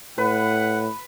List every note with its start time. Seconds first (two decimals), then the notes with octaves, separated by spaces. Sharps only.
0.18 A2 B4 F#5